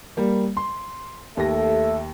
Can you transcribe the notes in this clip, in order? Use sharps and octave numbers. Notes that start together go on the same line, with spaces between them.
G3 A#3
C6
D#2 A3 G4 A4 E5 A#6